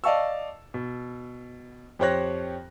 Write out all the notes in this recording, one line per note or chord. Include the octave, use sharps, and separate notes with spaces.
D5 D#5 F5 A5 C#6 E6
B2
F2 G4 C5 C#5 F#6 A#6